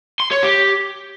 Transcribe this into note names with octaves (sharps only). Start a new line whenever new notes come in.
C6
C#5
G4